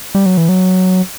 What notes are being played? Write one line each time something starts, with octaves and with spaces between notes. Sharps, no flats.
G3
F#3
E3
F#3